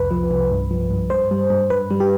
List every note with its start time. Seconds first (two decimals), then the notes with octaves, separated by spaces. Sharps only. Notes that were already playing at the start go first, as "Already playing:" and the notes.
Already playing: C2 F2 B4
0.11 F3
0.31 C2
0.51 G2
0.71 F3
0.90 G2
1.10 G2 C5
1.31 G3
1.50 G2
1.70 G2 B4
1.91 G3
2.00 G4